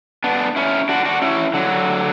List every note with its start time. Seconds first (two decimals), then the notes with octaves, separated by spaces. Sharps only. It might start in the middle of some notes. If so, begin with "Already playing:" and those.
0.24 B3 D4
0.56 C#4 E4
0.89 D4 F#4
1.05 D4 F#4
1.22 C#4 E4
1.54 D3 F#3